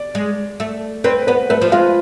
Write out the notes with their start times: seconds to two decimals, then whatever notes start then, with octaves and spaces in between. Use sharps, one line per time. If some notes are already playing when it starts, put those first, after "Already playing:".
Already playing: D5
0.15 G#3
0.60 A3
1.04 C4 B4
1.27 B3 B4
1.50 A3 B4
1.62 F3
1.72 G#3 F4